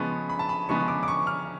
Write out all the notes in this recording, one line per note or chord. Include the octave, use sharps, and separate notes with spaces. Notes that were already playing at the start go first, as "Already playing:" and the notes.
Already playing: C#3 F3 G#3 B3 C#6
B5
A5
B5
C#3 F3 G#3 B3 C#6
D6
D6
C#6
F6